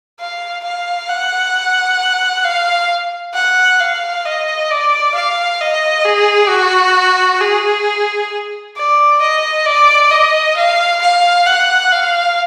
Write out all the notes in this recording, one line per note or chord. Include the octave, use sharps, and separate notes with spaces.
F5
F5
F#5
F5
F#5
F5
D#5
D5
F5
D#5
G#4
F#4
G#4
D5
D#5
D5
D#5
F5
F5
F#5
F5